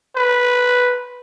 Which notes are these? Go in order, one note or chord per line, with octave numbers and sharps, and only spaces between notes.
B4